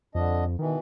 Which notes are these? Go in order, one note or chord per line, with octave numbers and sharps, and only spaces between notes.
F2 D3 D4 D#5
B2 D#3 E3